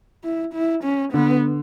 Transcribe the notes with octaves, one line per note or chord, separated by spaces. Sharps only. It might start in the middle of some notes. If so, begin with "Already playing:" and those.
E4
E4
C#4
D3 B3